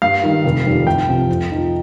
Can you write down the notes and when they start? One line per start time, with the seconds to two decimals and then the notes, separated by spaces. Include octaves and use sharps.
0.02 G2 F5
0.24 D#3 G3
0.45 F1
0.65 F2 D#3 G3
0.86 C2 G5
1.08 C3 F3
1.29 F2
1.50 F3 D#4